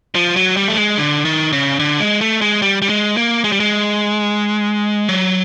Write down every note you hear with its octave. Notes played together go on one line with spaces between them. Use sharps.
F3
F#3
G3
A3
G#3
D3
D#3
C#3
D3
G#3
A3
G#3
G3
G3
G#3
A#3
G#3
G3
G#3
F#3